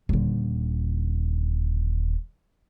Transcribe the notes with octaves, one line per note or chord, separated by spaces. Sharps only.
D#1 D3